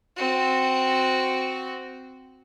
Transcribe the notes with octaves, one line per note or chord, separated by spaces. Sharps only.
C4 F#4